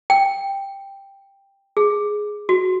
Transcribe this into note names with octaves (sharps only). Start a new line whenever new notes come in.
G5
G#4
F#4